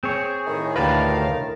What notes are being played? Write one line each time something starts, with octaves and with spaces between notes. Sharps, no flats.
C4 G#4 C#5
A2 D#3
D2 G4 A#4 B4 F5 A5